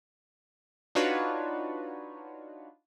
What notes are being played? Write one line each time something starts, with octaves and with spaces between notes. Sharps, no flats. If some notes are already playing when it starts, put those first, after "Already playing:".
D4 D#4 F4 F#4 B4 C#5